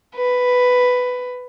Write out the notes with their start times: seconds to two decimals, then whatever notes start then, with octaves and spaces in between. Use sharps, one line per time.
0.14 B4